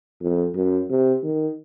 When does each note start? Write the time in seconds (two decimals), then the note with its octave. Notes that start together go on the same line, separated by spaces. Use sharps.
0.22 F2
0.56 F#2
0.90 C3
1.24 D#3